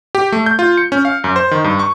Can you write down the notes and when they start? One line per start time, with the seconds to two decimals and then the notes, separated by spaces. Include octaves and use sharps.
0.15 G4
0.32 A3
0.46 G6
0.59 F4
0.77 C#7
0.92 C#4
1.05 F5
1.24 F#2
1.36 C5
1.51 D#3
1.64 G2
1.79 C#6